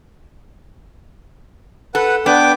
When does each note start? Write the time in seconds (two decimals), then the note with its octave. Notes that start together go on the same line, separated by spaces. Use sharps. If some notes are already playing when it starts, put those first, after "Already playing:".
1.95 A4 B4 F#5
2.26 B3 D4 G5 D6